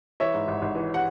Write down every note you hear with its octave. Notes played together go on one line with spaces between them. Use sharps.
E3 C#5 E5
G#2
G#1
G#1
E3
F#5